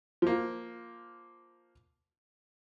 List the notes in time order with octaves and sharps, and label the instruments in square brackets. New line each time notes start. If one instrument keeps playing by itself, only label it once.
[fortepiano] F3 A#3